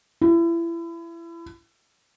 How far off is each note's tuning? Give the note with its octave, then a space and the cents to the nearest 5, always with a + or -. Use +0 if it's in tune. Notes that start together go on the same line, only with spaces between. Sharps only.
E4 +30